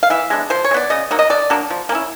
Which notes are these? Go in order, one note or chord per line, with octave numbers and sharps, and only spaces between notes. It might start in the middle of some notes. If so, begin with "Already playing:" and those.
F5
E3 E5
G#3 B3 D4
F3 C5
C#5
G#3
B3 D5
C#3 D#5
F#3 A#3 D#4
D#5
D3 D5
F#3 A#3 D4
F3
A#3
C#4 E4